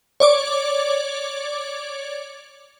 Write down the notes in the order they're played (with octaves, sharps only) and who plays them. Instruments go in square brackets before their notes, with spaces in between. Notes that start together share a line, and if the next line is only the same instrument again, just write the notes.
[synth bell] C#5 D5 D6